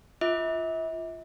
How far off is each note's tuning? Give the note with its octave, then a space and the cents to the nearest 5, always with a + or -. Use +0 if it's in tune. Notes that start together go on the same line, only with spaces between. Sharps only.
F4 -10 E5 -40 D6 +0